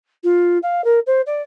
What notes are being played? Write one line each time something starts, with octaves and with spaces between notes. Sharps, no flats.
F4
F5
A#4
C5
D5